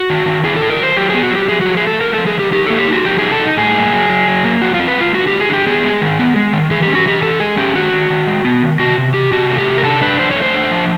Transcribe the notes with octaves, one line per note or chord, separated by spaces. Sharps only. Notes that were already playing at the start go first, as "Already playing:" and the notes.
Already playing: F#4
D#3
D#3
E4 G#4
A4
E4
A#4
F#3 C5
F#3 G4
B3 G#4
F#4
F#3 G4
F3 G#4
F3 F#4
G#4
A3 A4
A3 A#4
F3 A4
G#4
F3 G4
D#4 G4
A#3 A4
G4
D#4 F#4
F3 G4
D#4 G#4
A4
D#4
A2 G#4
A#3
F#3
F#3
F#3
A#3
F3 F#4
F4
C4
B4
G#3 F4
D3 F#4
G#3 G4
G#4
D3 G4
B3 G#4
G#3
D#3
B3
G#3
D#3
E3 G#4
G4
C#4
F#4
E3 G4
E3 A4
G#3 G#4
C#4 G4
D#3 F#4
D#3
D#3
G#3
B3
D#3
C3 F#4
C3
E3 G4
C3 F#4
A3
G4
C3
A#4
D4 A4
D4 B4
F3 C5
C#5
A3
C5
D4
F3